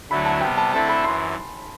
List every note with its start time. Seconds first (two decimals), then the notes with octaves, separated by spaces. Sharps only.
0.10 D2 D3 F#3 A3 E4 B5
0.26 A5
0.41 C3 G3 B3 G5
0.57 A5
0.73 D3 A3 C4 E4 A4 A5
0.89 B5
1.04 F#2 E3 C6